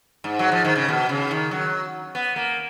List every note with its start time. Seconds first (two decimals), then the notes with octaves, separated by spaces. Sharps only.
0.24 G#2
0.39 F#3
0.52 F3
0.65 D#3
0.75 C#3
0.89 B2
1.09 C#3
1.31 D#3
1.51 F#3
2.15 B3
2.36 A#3